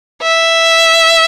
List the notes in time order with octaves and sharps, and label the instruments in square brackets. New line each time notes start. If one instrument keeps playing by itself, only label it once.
[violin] E5